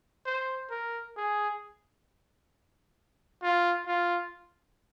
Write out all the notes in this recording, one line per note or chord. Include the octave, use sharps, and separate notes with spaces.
C5
A#4
G#4
F4
F4